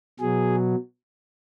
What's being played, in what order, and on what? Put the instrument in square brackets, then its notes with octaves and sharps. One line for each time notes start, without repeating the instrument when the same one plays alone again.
[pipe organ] B2 F#3 G#4